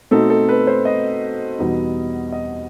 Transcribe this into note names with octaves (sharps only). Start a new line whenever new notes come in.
B2 A3 C4 D#4 A4
A4
B4
C5
D#5
E2 B2 G3 B3 D#4
D#5